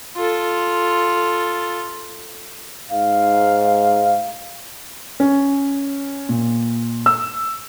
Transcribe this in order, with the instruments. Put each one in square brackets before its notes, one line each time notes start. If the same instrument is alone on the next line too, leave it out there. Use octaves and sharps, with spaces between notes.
[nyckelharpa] F4 A4
[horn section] G#2 F5
[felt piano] C#4
A#2
E6